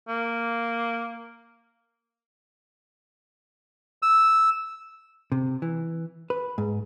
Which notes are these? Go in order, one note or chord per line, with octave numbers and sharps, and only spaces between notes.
A#3
E6
C3
E3
B4
G#2